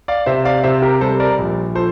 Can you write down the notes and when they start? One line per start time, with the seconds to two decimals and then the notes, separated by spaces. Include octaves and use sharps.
0.08 D5 F5
0.26 C3 C5 E5
0.45 D5 F5
0.64 C3 C5 E5
0.82 G4 A#4
1.01 G3 A4 C5
1.20 A#4 D5
1.38 A#1
1.75 F3 A4 C5